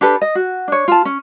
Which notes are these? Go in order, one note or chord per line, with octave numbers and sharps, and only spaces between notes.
D4 G4 A4 B4
D#5
F#4
D4 C#5
F4 A5
C#4